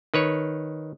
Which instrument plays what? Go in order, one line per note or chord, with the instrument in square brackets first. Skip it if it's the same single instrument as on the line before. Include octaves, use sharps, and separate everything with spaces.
[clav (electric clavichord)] D#3 B4 C#5